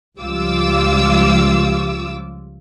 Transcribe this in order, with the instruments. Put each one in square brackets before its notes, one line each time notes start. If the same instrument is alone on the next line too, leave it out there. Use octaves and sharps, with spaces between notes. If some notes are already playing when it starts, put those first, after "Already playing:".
[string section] C#2 F3 G3 F4 D6 E6